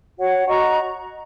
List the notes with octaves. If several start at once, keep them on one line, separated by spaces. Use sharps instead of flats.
F#4 C#5 F#5
F#4 D#5 A#5 C#6